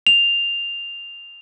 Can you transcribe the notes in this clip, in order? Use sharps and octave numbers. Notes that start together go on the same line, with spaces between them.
F7